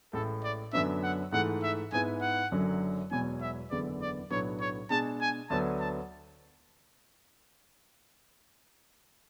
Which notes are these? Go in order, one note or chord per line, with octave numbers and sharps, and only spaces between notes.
A1 A2 G#3 A4
D5
F#2 D3 F#3 B3 D4 E5
F#5
G#2 E3 A3 F#5
E5
G#2 G#3 B3 E4 G#5
F#5
F#1 F#2 D3 F#3
E1 E2 B2 F#3 G#5
E5
F#1 E2 D3 G#3 B3 D5
D5
B1 A2 F#3 B3 D4 C#5
C#5
B2 G#3 D4 G#4 A5
G#5
D2 D3 F#3 B3 A5
A5